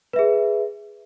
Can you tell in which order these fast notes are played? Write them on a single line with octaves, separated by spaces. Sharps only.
B4 E5 G#4